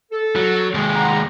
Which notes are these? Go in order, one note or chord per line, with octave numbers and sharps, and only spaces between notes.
A4
F#3
D#2 G#3
F#5 G5 A#5